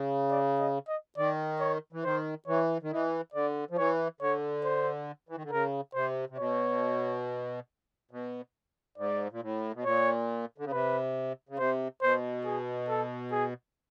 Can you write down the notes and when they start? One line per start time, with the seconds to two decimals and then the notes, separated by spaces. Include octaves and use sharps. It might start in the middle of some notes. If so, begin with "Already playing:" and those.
Already playing: C#3
0.30 D5
0.59 D#5
0.88 D#5
1.17 D#3 D5
1.60 C#5
1.93 E3
2.04 D#3 C5
2.47 E3 C#5
2.82 D#3
2.91 E3 D#5
3.34 D3 D5
3.71 F3
3.77 E3 C#5
4.21 D3 C#5
4.64 C5
5.29 E3
5.36 D#3
5.43 D3
5.51 C#3 A#4
5.94 C3 C5
6.30 C3
6.38 B2 C#5
8.11 B2
8.97 G#2 D5
9.32 A#2
9.42 A2
9.74 B2
9.85 A#2 C#5
10.58 D3
10.65 C#3
10.72 C3 B4
11.49 C#3
11.58 C3 C5
12.02 B2 C5
12.45 G#4
12.89 A4
13.32 G#4